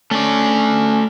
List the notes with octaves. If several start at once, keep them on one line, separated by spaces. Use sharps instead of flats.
A3 C#4 D5